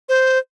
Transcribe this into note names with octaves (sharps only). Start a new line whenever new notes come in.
C5